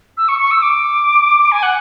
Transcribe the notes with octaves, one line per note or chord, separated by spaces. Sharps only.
E6
C#6
C#6
E6
D6
G#5
F#5